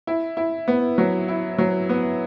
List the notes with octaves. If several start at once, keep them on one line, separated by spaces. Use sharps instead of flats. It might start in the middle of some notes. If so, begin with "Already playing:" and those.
E4
E4
B3
F#3
E4
F#3
B3